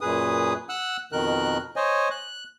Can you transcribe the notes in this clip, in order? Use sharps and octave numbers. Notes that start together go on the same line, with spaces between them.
F#2 A#2 G#4 B4 D#6
F#5 E6 F#6
F2 B2 D#3 A#4 F#6
C5 C#5 D#5 G#5
F#6